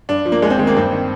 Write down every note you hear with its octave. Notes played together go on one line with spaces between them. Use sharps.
G2 D4
F3
A#3
D#2 G#3
C4
D#3 G#3
A#3
G2 C4
D#3